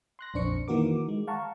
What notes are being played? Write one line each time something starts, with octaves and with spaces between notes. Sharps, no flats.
C6 F#6 A#6
A#1 F2 D4 C5 C#6 C#7
D#3 E3 A#3 F#4 A#4 D6
G#3
F5 F#5 A5 A#5 C#6